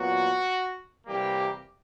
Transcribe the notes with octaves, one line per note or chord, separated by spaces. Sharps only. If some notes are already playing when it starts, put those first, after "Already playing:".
Already playing: A#2 F#3 B3 F#4
C3 E3 G3 A#3 G4